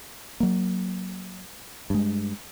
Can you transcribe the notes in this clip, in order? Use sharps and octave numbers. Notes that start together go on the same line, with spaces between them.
F#3 A#3
G2 G#3